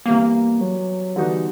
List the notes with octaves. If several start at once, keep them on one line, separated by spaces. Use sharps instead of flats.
C3 E3 G3 A#3 B3
F#3
D3 E3 G3 B3 D#4 F#4